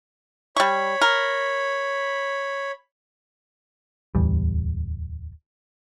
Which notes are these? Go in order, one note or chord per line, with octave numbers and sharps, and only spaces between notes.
G3 C#5 B5 C#6
A#4
D1 E2 G3